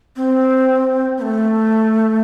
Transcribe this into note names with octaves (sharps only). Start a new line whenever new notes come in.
C4
B3
A3